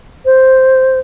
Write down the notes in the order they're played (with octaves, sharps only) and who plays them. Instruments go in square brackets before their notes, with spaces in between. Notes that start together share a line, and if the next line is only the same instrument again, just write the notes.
[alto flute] C5